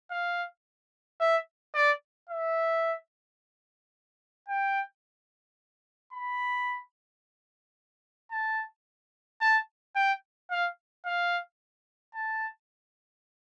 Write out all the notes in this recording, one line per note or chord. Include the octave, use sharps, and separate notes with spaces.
F5
E5
D5
E5
G5
B5
A5
A5
G5
F5
F5
A5